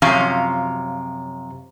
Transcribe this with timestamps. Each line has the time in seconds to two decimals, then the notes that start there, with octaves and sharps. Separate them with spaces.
0.02 F#2 C3 F3 C#4 F5 A#5